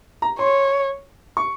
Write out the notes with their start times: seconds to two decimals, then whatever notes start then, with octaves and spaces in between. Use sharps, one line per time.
0.22 A#5
0.39 C#5 C6
1.37 C#6